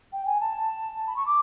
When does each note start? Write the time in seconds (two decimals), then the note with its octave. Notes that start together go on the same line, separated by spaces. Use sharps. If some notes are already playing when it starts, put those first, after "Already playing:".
0.13 G5
0.26 G#5
0.41 A5
1.07 B5
1.16 C#6
1.26 D6